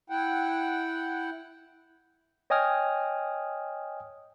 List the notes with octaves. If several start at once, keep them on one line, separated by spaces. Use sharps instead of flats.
E4 F#5 G5
C#5 D#5 G5 G#5 D#6 F6